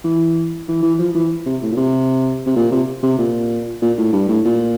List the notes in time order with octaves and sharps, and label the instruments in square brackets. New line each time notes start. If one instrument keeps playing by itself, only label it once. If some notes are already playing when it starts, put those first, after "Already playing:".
[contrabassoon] E3
E3
E3
F3
E3
C3
A2
A#2
C3
C3
A#2
C3
C3
A#2
A#2
A2
G2
A2
A#2